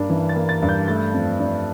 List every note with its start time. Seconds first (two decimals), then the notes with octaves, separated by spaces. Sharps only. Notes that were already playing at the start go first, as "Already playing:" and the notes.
Already playing: G2 A#3 D4
0.10 E3
0.29 A6
0.36 A#3
0.49 A6
0.63 G2
0.69 G6
0.88 A3 A6
1.13 F2
1.40 D4